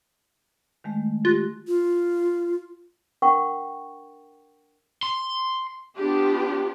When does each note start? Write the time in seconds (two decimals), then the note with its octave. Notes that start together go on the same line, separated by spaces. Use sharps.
0.84 D#3 G#3 A3
1.25 F4 G4 F#6 A#6
1.68 F4
3.22 D4 A#4 F#5 G5 C#6
5.03 C6
5.95 B3 D4 F4 G4